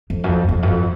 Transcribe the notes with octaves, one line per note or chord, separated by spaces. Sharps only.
F2
F#2
F2
F2
F#2
F2